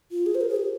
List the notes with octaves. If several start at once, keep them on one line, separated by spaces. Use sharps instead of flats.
F4
G#4
C5
A#4
G#4
G4